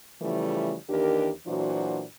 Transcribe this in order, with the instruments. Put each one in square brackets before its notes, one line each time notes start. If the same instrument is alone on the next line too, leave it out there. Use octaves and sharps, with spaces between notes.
[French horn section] C#3 E3 F3 G3 A3 E4
D#2 E3 D4 G4 A#4
A#2 E3 F#3 D4 F#4 C5